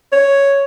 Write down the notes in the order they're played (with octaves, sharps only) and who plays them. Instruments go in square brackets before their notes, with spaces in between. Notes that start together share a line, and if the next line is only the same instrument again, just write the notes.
[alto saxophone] C#5